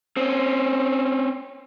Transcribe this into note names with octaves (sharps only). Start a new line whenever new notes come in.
C4 C#4